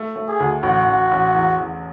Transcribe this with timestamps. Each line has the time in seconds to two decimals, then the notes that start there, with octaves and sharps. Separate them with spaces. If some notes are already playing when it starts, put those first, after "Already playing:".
Already playing: A3
0.16 A3
0.28 G#4
0.40 D2
0.63 A1 F#4
0.87 A1
1.11 A1
1.35 E2
1.59 E2